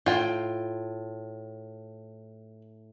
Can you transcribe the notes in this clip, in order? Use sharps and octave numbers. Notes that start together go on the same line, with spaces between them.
A2 F4 G5